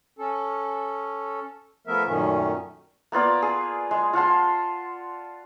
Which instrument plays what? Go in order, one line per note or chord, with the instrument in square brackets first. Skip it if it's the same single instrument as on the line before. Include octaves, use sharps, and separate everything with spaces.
[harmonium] C#4 A4
F3 A3 B3 A#4 E5
F#2 A#2 D#3 A3 C#4
[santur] A#3 B3 F4 D5
G#4
G#3
F4 F#5 A5 C6